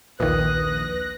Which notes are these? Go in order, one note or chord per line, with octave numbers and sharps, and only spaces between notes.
A#1 D#2 A#2 D#3 B4 D#6 F#6 A#6